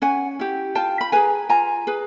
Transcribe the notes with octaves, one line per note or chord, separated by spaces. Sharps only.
C#4 F#5 G#5
E4 G4
F4 G5 A5
B5
G#4 B4 G#5 A#5
F4 G#5 A#5
G#4 B4